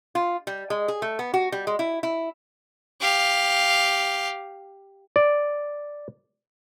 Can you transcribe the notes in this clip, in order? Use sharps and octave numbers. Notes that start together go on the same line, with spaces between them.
F4
G3
G#3
G#4
A3
B3
F#4
G3
G#3
E4
E4
G4 F5
D5